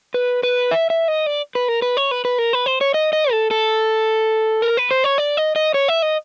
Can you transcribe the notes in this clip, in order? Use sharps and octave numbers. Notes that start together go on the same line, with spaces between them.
B4
B4
E5
E5
D#5
D5
B4
A#4
B4
C#5
B4
B4
A#4
B4
C5
C#5
D#5
D#5
A4
A4
A#4
B4
C5
C#5
D5
D#5
D#5
C#5
E5
D#5